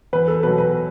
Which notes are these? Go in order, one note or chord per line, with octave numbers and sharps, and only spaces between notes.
E2 B4
A4
B2 F#3 B4
B4